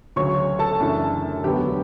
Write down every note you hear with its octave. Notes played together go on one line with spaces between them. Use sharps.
D2 C#3 F#3 C#5 C#6
A4 A5
F#2 C#3 E3 A3 D4
E1 D2 D3 F#3 B3 G4 G5